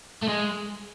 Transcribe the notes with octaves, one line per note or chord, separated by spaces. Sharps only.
A3
G#3